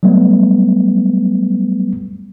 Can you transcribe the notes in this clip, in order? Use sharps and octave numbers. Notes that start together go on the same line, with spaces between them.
F#3 G3 A3 B3